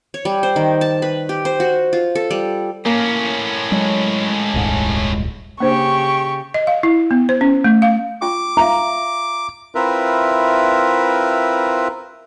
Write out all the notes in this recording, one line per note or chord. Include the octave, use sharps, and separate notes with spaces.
C#5
G3
C5
D#3
A5
B4
G4
C5
F#4
F4
A4
G3
A2 A#3 C#4
F#3 G#3
D#1 C2 G#2
C#3 A#3 D4 G4 C5 C#6
D#5
F5
E4
B3
C5
C#4
A3
F5
F4 G5 C#6 D6
F4 E5 F5 A#5
C4 E4 F4 A#4 B4 E5